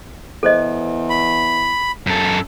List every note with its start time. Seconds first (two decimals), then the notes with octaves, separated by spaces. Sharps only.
0.43 E2 A4 C5 D#5
1.10 B5
2.07 F#2 A4